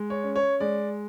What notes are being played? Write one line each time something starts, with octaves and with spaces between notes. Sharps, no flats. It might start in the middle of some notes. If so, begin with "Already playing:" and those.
Already playing: G#3
C#5
C#4
C#5
G#3 D5